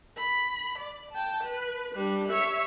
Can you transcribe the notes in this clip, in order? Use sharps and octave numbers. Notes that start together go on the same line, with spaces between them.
B5
D5
G5 A5
B4
G3 D4
C#5 E5